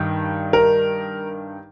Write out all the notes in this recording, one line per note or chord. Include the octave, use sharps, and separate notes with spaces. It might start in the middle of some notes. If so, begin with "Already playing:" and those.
Already playing: G2 D#3 G3
A#4